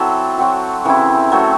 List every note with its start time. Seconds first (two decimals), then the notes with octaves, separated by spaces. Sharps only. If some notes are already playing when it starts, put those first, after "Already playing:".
Already playing: F#3 C4 E4 A4
0.38 F#3 C4 F#4
0.85 C#3 E3 C4 E4
1.32 F#3 A3 C4